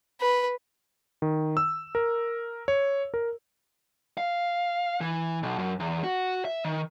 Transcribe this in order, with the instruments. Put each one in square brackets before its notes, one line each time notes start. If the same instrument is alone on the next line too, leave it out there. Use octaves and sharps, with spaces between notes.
[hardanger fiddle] B4
[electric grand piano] D#3
E6
A#4
C#5
A#4
[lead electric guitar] F5
E3
B1
F#2
E2
F#4
E5
D#3